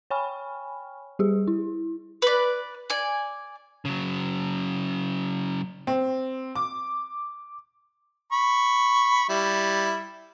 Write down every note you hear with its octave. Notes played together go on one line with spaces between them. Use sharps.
C#5 G5 G#5 B5 C#6 F6
G3 G4 G#4
E4
B4 D5
D5 G#5
C#3 F#3
C4
D6
B5 C#6
G3 E4